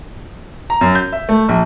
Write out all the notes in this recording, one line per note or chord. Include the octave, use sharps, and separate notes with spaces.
A#5
F#2
G6
E5
A3
A#1